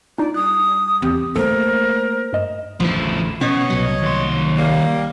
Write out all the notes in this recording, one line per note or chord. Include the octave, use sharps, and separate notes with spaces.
D4 D#4 F4 D5
G3 D#6 F#6
E2 C4 G4
A3 A#3 A4 A#4 C5
G2 D#5 E7
A1 E2 D3 F3 E4
B2 C#4 C#5 D#5
C2 F#3
D#2 C6
G3 A#3